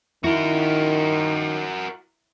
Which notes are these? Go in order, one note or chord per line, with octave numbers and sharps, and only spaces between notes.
D#3 E4 F#4 A#4